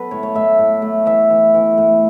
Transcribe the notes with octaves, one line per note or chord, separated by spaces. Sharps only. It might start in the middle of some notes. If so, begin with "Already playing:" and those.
Already playing: F#3 B3 A4 B4
A2 C#5
C#5
A2 E5
A2
A3
E3 E5
E3
E3
A2